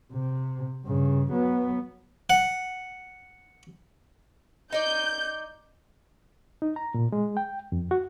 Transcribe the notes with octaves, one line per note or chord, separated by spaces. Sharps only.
C3
G2 C#3
F#3 B3
F#5
D#4 D5 G6
D#4
A#5
A#2
G#3
G5
F2
F#4